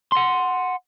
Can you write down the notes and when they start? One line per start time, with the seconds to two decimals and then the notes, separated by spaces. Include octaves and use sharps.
0.12 F#5 C6